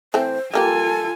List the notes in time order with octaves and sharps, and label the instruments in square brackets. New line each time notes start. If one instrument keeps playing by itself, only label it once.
[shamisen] E3 A3 C4 [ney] C5
[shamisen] G3 A#3 G4 [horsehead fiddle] F4 G#5 [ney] A4